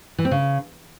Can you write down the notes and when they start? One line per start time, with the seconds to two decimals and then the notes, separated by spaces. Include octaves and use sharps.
0.18 E3
0.25 C4
0.31 C#3